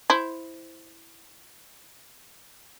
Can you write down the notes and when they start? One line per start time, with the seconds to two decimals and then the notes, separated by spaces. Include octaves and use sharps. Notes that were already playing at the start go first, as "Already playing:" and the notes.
0.10 E4 C5